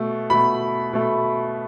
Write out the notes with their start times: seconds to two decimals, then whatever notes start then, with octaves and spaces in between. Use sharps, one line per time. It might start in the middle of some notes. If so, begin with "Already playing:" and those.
Already playing: B2 A3
0.30 B2 A3 B5
0.93 B2 A3